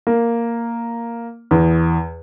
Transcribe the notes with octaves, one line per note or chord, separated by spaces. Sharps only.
A#3
E2